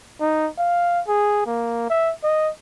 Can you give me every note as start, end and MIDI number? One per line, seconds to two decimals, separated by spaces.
0.21 0.48 63
0.58 1.01 77
1.08 1.46 68
1.46 1.89 58
1.90 2.12 76
2.23 2.50 75